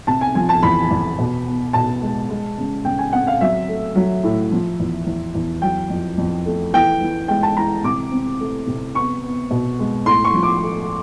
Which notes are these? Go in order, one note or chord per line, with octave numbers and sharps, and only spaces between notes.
C3 A5
G#5
F3 G#5
A5
E2 B5
E2
B2
B3
B2 A5
G#3
G#3
C#3
C#3 G5
G#5
C4 F#5
F5
F#3 E5
A3
F#3
A2
F3
E2
E2
E2
F#3 G5
F2
F2
A3
E3 G5
E3
G#3 G5
A5
E3 A#5
C3 D6
C4
A3
C3
B3 C#6
B3
B2
G#3
A2 C6
C#6
F3
D6
A3